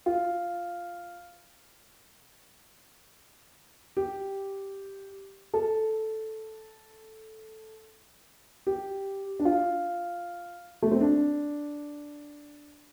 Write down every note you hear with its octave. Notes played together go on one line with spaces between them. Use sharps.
F4
G4
A4
G4
D4
F4
A3
C4
D4